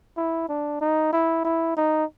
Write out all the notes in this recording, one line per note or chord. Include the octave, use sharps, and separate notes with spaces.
E4
D4
D#4
E4
E4
D#4